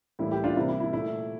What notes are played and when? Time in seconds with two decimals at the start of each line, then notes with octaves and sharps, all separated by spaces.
0.19 A2 E3 G3 A#3 E4
0.31 E4 G4
0.44 D4 F4
0.56 C3 E3 G3 A#3 E4
0.69 E4
0.80 E4
0.93 A#2 A3 E4